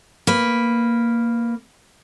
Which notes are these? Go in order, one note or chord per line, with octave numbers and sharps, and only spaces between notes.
A#3 B4